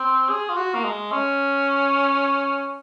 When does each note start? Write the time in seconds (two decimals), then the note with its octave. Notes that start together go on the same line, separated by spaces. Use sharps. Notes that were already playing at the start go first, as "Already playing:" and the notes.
Already playing: C4
0.29 G#4
0.49 F4
0.57 F#4
0.75 A#3
0.84 G#3
1.12 C#4